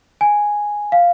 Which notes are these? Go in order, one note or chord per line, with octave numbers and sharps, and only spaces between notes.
G#5
F5